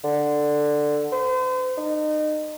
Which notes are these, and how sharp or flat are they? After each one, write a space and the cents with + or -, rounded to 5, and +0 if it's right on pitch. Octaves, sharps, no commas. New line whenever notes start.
D3 +10
C5 -40
D#4 -30